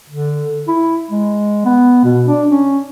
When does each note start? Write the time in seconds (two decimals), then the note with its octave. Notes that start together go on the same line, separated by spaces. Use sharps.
0.10 D3
0.68 E4
1.11 G#3
1.65 B3
2.04 B2
2.26 D4
2.49 C#4